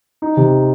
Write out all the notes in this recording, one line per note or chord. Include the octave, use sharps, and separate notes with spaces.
D#4
C3